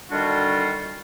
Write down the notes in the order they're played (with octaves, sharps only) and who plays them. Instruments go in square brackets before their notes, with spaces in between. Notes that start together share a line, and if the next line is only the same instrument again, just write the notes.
[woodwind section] D3 D#3 G3 D4 F4 F#4